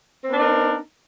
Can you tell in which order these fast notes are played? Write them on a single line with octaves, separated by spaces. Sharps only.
C4 B3 D4 D#4 A#4